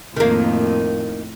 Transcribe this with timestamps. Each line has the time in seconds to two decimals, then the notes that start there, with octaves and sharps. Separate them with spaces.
0.16 F2 A2 D#3 A#3